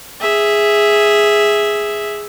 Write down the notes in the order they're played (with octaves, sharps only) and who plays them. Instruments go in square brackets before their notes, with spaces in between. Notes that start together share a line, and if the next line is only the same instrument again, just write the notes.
[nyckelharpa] G#4 E5